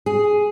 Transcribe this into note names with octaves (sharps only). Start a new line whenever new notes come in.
G#4